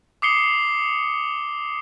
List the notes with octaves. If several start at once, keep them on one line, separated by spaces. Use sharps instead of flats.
D6 D#6 C7 C#7 G7